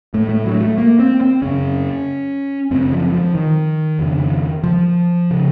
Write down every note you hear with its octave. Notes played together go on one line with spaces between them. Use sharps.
A2 A3
A3
F#3
A3
A#3
C4
C4
F#2 C#3 C#4
F#2 C#3 C4
F3
F3
D#3
F2 C#3
F3
C#3